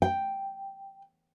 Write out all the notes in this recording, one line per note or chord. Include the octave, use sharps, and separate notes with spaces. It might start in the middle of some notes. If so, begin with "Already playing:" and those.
G5